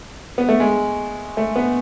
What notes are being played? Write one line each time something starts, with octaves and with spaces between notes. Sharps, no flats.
B3
A3
G#3
A3
B3